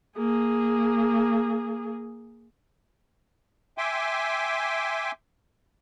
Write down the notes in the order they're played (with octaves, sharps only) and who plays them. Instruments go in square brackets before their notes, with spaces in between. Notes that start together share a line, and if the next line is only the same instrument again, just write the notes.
[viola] A#3 G#4
[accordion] E5 G5 G#5 C6 D6